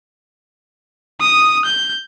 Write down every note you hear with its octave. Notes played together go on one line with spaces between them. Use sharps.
D#6
G6